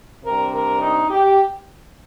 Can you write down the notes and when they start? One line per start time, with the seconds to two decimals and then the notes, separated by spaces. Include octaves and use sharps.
0.24 C3 G3 D4 A#4
0.53 A#4
0.81 D#4
1.10 G4